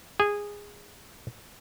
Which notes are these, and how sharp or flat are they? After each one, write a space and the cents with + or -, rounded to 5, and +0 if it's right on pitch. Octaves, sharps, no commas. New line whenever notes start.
G#4 -15